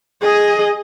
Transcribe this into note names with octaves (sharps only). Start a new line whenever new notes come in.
G#4 D#5